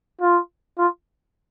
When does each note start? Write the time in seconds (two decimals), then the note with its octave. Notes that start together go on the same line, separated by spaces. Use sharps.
0.22 F4
0.78 F4